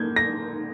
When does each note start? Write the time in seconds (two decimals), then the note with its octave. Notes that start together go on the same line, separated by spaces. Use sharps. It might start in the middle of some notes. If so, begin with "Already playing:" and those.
Already playing: A#3 G6 G#6
0.16 A#6